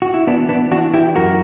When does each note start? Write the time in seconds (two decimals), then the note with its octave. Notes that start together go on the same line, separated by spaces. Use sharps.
0.02 F#4
0.14 E4
0.27 E3 B3 D4
0.49 B3 D4
0.71 E3 D4 F#4
0.94 E4 G4
1.16 F#2 F#4 A#4